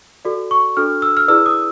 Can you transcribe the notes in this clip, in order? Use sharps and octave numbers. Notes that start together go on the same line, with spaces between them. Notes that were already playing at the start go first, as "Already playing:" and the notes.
F#4 A4 D5
C#6
D4 F#4 A4 F6
E6
F6
E4 G#4 B4 D5 E6
D#6